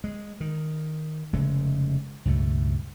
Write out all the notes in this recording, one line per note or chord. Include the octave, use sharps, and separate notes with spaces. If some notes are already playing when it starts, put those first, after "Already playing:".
G#3
D#3
F1 C#3 G#3 A3
C#2 G2 B2 A3